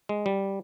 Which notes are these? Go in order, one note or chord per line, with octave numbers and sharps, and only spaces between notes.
G#3
G3